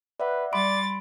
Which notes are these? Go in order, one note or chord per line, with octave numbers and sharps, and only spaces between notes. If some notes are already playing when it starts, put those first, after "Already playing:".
B4 D5 E5 F#5
G3 D5 B5 C6 A6 D7